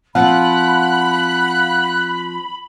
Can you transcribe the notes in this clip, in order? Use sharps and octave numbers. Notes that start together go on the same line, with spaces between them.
F3 C4 F5 F#5 B5 F#6